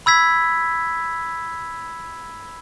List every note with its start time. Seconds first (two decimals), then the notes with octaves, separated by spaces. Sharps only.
0.06 B5 E6 G#6 B6